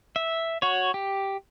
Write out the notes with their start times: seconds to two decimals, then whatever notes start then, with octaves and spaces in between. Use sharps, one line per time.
0.16 E5
0.62 F#4 C#5
0.94 G4